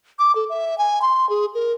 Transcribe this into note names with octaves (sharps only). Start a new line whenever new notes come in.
D6
A4
E5
G#5
C6
G#4
A#4